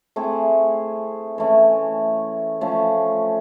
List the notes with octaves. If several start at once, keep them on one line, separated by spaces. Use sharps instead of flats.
A3 C4 E4 G#4
E3 A3 C#4
F3 A3 C#4